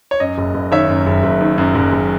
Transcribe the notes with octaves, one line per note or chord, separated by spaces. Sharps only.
C#5
F#2 D#5
F#1
F#1
D#3 C#5 E5
F#2
F#1
F#1
D#3
F#2
F#1
F#1